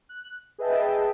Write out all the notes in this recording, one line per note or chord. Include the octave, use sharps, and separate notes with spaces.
F#6
G#4 B4 D#5 E5 G5 A5